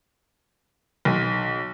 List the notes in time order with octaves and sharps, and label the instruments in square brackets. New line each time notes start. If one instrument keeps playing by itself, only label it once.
[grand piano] B1